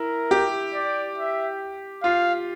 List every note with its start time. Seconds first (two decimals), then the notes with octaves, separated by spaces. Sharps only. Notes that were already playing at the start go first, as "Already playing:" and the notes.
Already playing: E4 A#4
0.31 G4
0.74 D5
1.18 E5
2.03 F4 F5